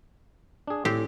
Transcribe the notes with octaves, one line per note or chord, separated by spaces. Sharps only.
D4 G#4
A2 C4 G4